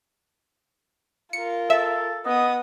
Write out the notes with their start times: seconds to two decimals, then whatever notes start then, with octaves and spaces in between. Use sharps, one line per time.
1.33 F4 A#4 C#7
1.70 A4 E5
2.26 B3 D#5 D#6